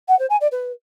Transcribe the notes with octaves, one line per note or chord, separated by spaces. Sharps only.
F#5
C5
G#5
D5
B4